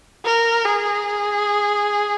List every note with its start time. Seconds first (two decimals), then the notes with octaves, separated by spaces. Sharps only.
0.24 A#4
0.65 G#4